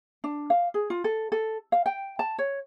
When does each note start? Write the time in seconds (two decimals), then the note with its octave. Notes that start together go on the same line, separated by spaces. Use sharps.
0.24 D4
0.50 F5
0.74 G#4
0.90 F4
1.04 A4
1.32 A4
1.72 F5
1.86 G5
2.19 A5
2.39 C#5